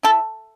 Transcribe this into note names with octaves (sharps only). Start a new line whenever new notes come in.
E4 A4